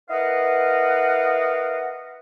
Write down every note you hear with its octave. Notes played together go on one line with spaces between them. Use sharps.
E4 A#4 B4 D#5 F5 F#5